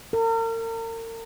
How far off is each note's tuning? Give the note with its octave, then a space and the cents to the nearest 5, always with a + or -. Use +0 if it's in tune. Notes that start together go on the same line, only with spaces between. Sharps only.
A#4 -40